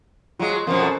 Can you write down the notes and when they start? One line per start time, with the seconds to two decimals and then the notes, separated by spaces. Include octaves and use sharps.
0.39 F#3 G#3 F4
0.67 F#2 B2 F3 C4 A#4 C5
0.81 C#4 A4 A5